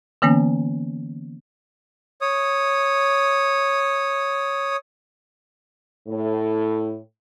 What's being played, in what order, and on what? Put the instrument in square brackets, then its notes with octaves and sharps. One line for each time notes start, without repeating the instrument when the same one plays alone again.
[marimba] D3 E3 A#3 B3 C#4
[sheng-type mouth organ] C#5 D#6
[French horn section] A2